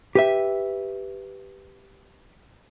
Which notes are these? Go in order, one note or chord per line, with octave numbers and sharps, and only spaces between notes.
G4 B4 E5